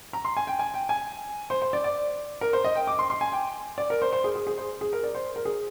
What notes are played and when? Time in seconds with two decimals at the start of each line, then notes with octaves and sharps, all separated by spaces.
0.13 A#5
0.25 C6
0.37 G#5
0.47 G5
0.59 G#5
0.74 G5
0.89 G#5
1.50 C5
1.62 C5
1.73 D5
1.84 D5
2.41 A#4
2.53 C5
2.64 D#5
2.76 G5
2.87 D6
2.99 C6
3.10 C6
3.21 G#5
3.32 G5
3.78 D5
3.90 A#4
4.02 C5
4.13 C5
4.24 G#4
4.35 G#4
4.47 G#4
4.58 C5
4.81 G#4
4.93 A#4
5.03 D5
5.15 C5
5.36 A#4
5.45 G#4